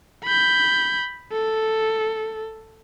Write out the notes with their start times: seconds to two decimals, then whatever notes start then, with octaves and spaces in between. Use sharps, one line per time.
0.24 B5 G6
1.32 A4